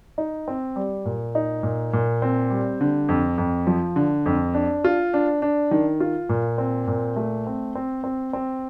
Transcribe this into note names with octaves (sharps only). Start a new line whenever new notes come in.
D#4
C4
G3
A#2
D#4
A#2
A#2
C4
G3
D3
F2
F2
F3
D3
F2
D4
F4
D4
D4
D#3
F4
A#2
C4
A#2
A3
C4
C4
C4
C4